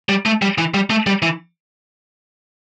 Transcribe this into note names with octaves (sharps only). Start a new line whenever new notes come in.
G3
A3
G3
E3
G3
A3
G3
E3